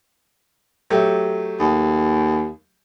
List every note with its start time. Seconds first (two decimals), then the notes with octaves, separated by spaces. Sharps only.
0.90 F#3 A3 G4
1.60 D#2